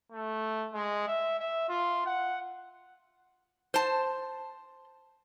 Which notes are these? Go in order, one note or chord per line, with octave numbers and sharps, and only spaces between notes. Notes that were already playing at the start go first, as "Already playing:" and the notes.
A3
G#3
E5
E5
F4
F#5
C5 A5